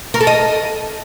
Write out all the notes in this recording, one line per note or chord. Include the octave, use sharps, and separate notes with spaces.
A#4
A4
D#5